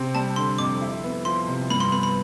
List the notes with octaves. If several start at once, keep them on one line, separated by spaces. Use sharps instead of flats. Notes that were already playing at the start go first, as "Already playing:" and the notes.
Already playing: C3 C4
G3 A5
D3 C6
F2 D6
E4
B3
F3 C6
C3
G2 B5
C6
B3 B5
B5